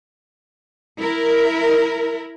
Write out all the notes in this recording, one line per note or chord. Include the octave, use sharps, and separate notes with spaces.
E4 A#4